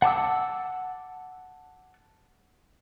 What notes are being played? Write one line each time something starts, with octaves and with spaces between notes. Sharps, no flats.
F#5 A5 D6 E6